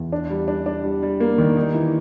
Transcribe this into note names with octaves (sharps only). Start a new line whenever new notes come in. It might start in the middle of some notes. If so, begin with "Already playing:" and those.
Already playing: E2
D4
G3
D4
D4
G3
G3
A#3
D#3
D#4
E3